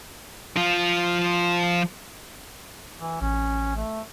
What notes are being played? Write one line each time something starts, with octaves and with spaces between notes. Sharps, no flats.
F3 F4
E3
A1 C#4
A3